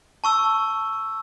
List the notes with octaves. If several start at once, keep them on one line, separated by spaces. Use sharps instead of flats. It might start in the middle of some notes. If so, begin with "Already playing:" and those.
A5 C#6 E6